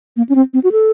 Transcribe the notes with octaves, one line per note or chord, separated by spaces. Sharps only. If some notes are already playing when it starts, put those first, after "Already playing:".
A#3
C#4
C4
C4
F#4
A4